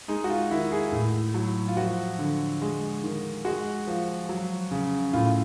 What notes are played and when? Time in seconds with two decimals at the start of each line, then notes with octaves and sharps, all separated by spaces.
0.08 G#3 D#4
0.24 F#4
0.30 F4
0.51 D#3 E4
0.72 G#4
0.92 A2
1.34 F#3
1.68 F4
1.77 F3 F#4
2.19 D3
2.62 G#3
3.03 D#3
3.45 G#3 F#4
3.87 F3
4.29 F#3
4.71 C#3
5.13 A2 F4